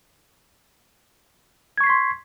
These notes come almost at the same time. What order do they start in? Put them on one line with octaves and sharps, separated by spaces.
G#6 C#6 C7 B6 C6